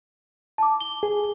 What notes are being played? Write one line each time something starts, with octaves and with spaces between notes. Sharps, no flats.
A5 D6
G7
G#4